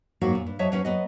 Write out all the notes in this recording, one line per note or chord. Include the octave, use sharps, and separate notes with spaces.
G#2 F#3 A#3 B3 F#4
F#2 A#2
G2
F#3 C#5 D#5 E5 A5
F#3 C#4 B4
F#3 B3 D#5